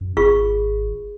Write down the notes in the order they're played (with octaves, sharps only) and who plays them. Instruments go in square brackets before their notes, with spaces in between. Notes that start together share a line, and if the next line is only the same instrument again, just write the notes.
[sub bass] F#2
[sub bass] G#1 [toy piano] F4 G#4 C#6